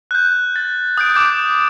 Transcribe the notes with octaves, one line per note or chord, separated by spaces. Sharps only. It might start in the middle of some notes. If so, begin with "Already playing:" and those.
F#6 G6
A6
D#6 G6 D7
D6 G6 D7